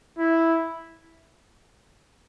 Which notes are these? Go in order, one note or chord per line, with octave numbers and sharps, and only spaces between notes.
E4